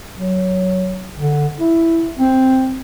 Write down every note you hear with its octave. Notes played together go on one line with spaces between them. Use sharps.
F#3
D3
E4
C4